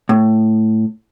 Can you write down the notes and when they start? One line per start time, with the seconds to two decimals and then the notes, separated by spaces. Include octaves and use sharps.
0.09 A2